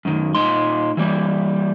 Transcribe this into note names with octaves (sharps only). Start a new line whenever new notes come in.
F#2 D#3
A#2 D#4 C6
E3 G3 A#3